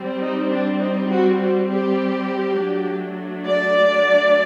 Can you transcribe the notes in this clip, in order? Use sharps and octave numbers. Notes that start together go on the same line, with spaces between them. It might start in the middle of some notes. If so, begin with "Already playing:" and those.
Already playing: G3 C4
D#4
D4
D#4
F#4
F#4
G4
F#3 A3 D4
D5